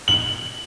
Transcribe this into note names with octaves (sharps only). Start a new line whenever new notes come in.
F#7